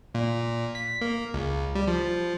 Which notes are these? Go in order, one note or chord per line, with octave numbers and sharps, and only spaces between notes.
A#2
B6
A#3
C#2
G3
F3